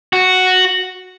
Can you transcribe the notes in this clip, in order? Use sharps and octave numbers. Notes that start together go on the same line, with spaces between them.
F#4